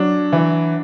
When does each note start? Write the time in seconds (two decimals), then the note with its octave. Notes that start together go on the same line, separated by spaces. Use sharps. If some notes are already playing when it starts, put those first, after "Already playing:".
Already playing: F#3 D4
0.33 E3